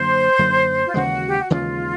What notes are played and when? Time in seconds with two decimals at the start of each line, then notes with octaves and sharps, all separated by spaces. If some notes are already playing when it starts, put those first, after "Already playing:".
Already playing: F#2 D3 F#3 A#3 C5
0.39 F#2 D3 F#3 A#3
0.86 F4
0.94 D#2 C#3 E3 G#3 F#4
1.28 G4
1.39 F#4
1.50 D#2 C#3 E3 G#3 F4